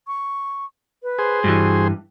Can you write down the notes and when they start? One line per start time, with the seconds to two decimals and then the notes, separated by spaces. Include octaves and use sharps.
0.07 C#6
1.03 B4
1.18 G#4 C5
1.44 G2 E3 F#4